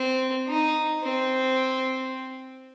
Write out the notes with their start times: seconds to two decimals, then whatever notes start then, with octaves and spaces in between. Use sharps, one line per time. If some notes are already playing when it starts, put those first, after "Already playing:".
Already playing: C4
0.48 D#4
1.03 C4